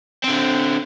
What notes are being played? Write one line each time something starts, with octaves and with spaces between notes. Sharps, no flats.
D3 C4